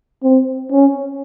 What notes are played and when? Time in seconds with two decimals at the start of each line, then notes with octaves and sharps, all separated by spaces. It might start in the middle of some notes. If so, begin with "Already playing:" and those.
0.23 C4
0.72 C#4